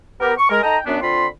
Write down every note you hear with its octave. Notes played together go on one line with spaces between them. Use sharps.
B3 G4 A#4
C#6
G#3 A#4
D#4 A4 D#5 G5 A#5
F#2 B3 D4
D3 C4 F4 B5 C6